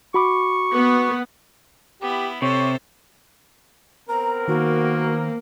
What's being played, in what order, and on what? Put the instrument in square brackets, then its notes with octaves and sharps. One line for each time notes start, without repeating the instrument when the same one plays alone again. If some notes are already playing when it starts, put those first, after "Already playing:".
[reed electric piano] F#4 B5 D6 [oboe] C#6
[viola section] B3
[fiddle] B3 E4 [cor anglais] G4
[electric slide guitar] C3 [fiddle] A4 C5 [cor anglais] C#5
[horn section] B3 C4 A#4 [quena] A#5
[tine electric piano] D#3 [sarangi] A#3 [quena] F#4